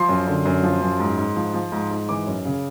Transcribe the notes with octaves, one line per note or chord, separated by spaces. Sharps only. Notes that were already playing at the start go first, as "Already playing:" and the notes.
Already playing: F3 C6
F#2
D3
F#2
F3
F#2
G#2
G#2
F3
F3
G#2
G#2
E3 D6
F#2
C#3